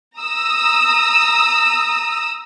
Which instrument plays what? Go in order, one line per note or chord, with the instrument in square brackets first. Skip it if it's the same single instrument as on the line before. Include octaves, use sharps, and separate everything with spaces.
[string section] A#5 D#6 E6